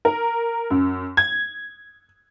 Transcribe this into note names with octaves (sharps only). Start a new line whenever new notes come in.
A#4
F#2
G#6